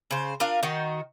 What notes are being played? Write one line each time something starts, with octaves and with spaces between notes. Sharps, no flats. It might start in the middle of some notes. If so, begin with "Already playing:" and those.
C#3 C5
D4 F4 A#4 F5
D#3 D#4 F#4